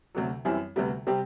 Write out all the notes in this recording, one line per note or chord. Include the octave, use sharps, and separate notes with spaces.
D2 C3 F#3
F#2 E3 G3 C4 E4
D2 C3 G3 B3
C3 G3 C4 G4